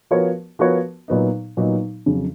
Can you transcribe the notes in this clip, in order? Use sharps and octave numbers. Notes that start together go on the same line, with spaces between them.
F3 B3 F#4 A#4 C#5
F3 B3 F#4 A#4 C#5
A#2 F#3 B3 D#4
A#2 F#3 B3 D#4
F2 C#3 F#3